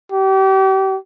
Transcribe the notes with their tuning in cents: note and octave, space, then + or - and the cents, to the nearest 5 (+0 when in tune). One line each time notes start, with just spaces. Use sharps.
G4 -35